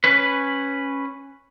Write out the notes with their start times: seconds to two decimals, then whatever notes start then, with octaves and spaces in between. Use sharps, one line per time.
0.04 C#4 B4